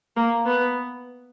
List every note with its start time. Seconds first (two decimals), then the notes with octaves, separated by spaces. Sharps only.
0.16 A#3
0.46 B3